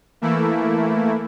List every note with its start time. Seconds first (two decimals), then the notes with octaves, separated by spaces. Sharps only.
0.21 E3 A3 A#3 E4